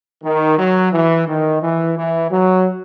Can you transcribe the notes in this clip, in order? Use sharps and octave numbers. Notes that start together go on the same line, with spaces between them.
D#3
F#3
E3
D#3
E3
E3
F#3